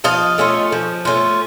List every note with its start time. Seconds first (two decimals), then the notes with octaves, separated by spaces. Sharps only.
0.04 F3 D#5 F5
0.38 A3 C#4 F4
0.72 F3
1.05 A3 C#4 F4